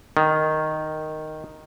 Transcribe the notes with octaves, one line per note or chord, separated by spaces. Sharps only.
D#3